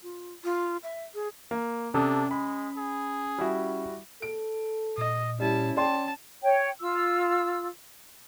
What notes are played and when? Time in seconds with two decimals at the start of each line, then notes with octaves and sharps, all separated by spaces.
0.03 F4
0.44 F4
0.83 E5
1.14 G#4
1.51 A#3
1.94 C3 C#4 D4 A4 D#6
2.31 G#3 B5
2.77 G#4
3.38 G3 E4 F#4
4.22 A4 D7
4.98 A#2 D#5
5.40 G3 C#4 E4 A5
5.77 D5 G5 A5 C6
6.43 C#5 G5
6.80 F4 E6